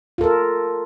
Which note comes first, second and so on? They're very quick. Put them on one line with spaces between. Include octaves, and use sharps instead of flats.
F4 A4 A#4